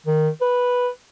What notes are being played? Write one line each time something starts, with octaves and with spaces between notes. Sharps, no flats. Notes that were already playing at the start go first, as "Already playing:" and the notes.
D#3
B4